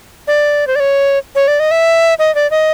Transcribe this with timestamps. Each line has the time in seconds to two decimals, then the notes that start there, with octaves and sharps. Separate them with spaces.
0.27 D5
0.67 C5
0.76 D5
0.80 C#5
1.35 C#5
1.48 D5
1.60 D#5
1.71 E5
2.19 D#5
2.35 D5
2.51 D#5